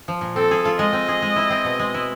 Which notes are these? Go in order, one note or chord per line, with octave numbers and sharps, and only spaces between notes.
F3
A#2
C4 A4
G#4
F4
G#3 D#5
C4
G#4
G#3
E4
C4
B2
G#3
E4